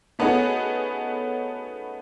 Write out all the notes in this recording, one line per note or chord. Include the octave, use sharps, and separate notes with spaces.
A3 B3 C#4 D#4 F#4 G#4